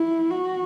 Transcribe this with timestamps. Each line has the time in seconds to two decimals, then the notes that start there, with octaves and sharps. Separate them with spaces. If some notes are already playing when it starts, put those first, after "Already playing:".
Already playing: E4
0.31 F#4